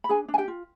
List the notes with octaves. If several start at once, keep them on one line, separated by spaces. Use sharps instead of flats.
B5
D4 G#4 G#5
D4
G#5
G4 G5
F4